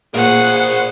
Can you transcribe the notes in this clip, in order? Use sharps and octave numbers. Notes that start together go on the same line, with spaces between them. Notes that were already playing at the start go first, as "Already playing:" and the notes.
A#2 G#4 A#4 C5 F#5